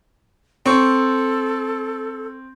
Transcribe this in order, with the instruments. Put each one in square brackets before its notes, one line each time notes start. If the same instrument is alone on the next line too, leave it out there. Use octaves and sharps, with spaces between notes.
[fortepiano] C4 C#6 [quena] A4